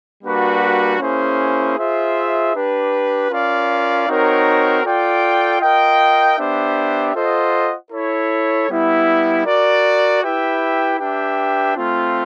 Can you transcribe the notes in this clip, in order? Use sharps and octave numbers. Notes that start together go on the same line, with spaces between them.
G3 A#3 D4 F#4 B4
A#3 C#4 E4 G#4 C5
F4 G#4 C5 E5
D4 G4 B4
C#4 F4 A#4 D5 F5
C4 D#4 F#4 A#4 C#5
F4 A4 D5 G5
F4 A#4 D#5 G5
B3 D4 G4 C5 E5
F4 A4 C5 D#5 F#5
E4 A4 C#5
G3 B3 E4
F#4 A#4 D5
E4 G4 B4 E5 G5
D4 G4 B4 E5 G5
A3 C4 F4